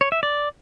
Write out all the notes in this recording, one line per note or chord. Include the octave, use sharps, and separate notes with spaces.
C#5
E5
D5